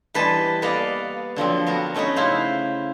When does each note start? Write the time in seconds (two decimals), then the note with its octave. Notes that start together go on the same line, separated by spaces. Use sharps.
0.14 E3 G3 B4 C5 D#5 A5
0.62 A#3 B3 B4 D5 D#5 F5
1.36 D3 F3 F#3 C4
1.67 B3 F#4 A#4
1.95 A3 C#4 D#4 F#4 B4
2.16 C#3 E4 C5 F5